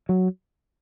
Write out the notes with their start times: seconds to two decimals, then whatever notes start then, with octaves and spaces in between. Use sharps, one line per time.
0.09 F#3